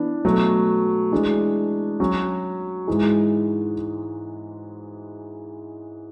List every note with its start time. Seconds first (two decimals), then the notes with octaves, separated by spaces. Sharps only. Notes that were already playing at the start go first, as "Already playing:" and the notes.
Already playing: E3 B3 D4
0.25 B2 F#3 A3
1.12 E3 G#3 D4
2.00 F#3 C#4 F#4
2.87 G#2 E3 G#3